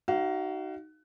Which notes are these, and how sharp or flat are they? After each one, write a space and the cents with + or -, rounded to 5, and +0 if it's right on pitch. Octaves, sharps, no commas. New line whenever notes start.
D#4 +0 F#4 +25 F5 -15